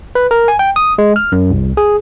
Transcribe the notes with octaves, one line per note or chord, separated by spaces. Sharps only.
B4
A#4
G#5
G5
D#6
G#3
F6
F#2
C2
G#4